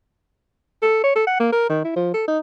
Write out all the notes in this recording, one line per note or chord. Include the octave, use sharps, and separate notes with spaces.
A4
C#5
A4
F#5
A#3
A#4
D#3
E4
F3
A4
D#4